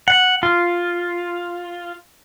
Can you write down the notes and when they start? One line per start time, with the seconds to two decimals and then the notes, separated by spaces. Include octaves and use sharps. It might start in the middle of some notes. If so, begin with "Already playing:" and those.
0.08 F#5
0.43 F4